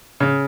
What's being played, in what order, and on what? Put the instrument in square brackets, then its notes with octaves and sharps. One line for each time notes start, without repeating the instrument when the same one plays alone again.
[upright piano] C#3